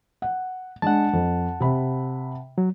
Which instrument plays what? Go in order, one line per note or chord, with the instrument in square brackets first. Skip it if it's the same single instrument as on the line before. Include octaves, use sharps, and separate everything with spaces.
[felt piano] F#5
[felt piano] G#3 D4 [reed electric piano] F#5 A5
[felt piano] F2
C3 B5
[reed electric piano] F#3